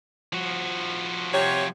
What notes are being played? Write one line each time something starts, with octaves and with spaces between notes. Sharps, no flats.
F3 F#4
C3 C#5